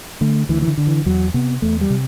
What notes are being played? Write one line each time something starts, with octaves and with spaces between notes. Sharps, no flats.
D3 A3
D2 E3
E3
D3
D3
E3
E2 F#3
C3 B3
E2 A3
G3
C3